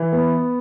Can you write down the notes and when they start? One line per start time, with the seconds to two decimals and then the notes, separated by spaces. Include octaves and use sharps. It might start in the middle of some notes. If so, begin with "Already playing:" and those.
Already playing: E3
0.12 B3